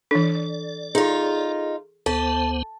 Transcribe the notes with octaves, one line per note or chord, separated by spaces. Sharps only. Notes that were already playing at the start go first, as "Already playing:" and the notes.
E3 D4 A4 D5
D#4 F4 G#4 A4
D2 B3 A4 C5 A5